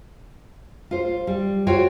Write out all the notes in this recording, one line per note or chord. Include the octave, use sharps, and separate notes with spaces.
F4 C5
G3
F4 F#4 C5 C#5 G5